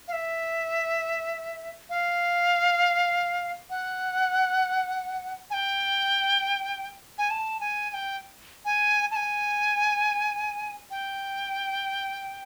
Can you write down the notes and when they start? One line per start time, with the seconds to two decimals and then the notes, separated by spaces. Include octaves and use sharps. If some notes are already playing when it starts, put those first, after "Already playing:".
0.08 F5
0.13 E5
1.90 F5
3.70 F#5
5.50 G#5
5.54 G5
7.18 G#5
7.30 A5
7.61 G#5
7.90 G#5
7.94 G5
8.65 G#5
9.11 A5
9.16 G#5
10.91 G5